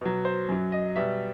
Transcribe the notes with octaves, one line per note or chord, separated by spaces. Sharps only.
B2 F#3
C5
F#2 F#3
D#5
B2 G3 E5